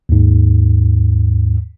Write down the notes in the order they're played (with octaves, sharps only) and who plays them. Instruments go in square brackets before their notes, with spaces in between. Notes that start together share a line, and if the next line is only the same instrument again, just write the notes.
[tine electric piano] D#2 G#2